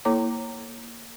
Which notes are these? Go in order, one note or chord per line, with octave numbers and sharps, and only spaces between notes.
A#3 E4 A4 C#5 A#5 D6